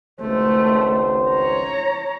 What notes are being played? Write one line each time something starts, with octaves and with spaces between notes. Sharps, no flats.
G#1 C#2 A3 C5
C#5 A#5